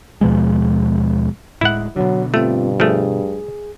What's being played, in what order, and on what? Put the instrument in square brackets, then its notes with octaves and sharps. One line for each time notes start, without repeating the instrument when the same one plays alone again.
[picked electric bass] D#2 B2 F3 G#3
[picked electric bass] D1 A2 G#3 [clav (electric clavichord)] E4 F#5
[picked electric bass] B2 D3 [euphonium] F#3
[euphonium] G2 [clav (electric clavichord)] A3 [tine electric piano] C4 F4
[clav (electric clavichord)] F3 A3 [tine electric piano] G#4